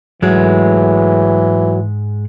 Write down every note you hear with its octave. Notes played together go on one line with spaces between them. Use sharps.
G#2 E3 F#3 G#3 A3